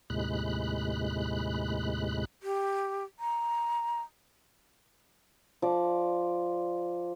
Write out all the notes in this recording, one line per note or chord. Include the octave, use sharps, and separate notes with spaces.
D#2 A2 C3 G#3 B5 F#6
G4
A#5
F3 D5